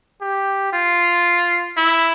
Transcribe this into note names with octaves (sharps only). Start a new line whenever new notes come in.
G4
F4
E4